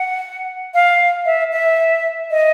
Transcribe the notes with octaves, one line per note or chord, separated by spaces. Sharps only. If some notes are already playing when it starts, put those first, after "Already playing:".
Already playing: F#5
F5
E5
E5
D#5